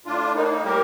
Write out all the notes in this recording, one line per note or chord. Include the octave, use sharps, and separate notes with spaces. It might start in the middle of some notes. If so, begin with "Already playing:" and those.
A2 D4 F4
A#3 D#4
D4
D#4
G3 G4 A#4